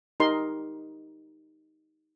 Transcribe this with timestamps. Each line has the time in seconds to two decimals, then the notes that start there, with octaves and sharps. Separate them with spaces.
0.20 D#4 G4 A#4 D#5 C6